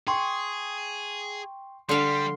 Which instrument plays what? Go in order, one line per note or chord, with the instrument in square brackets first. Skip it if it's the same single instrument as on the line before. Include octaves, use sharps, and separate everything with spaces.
[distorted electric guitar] G#4 [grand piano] G5 C6 C#6
[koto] D3 F5 [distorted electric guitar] G3 [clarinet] C6